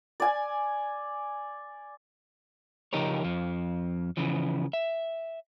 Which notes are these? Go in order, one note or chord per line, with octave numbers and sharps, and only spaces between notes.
D5 G#5
C#3 F3 D#4 G4 A#4 C#5
F2 F3
C#3 E3 F3
E5